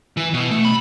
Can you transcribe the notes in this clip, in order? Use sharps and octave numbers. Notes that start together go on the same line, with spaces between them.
E3
B2
A3
B5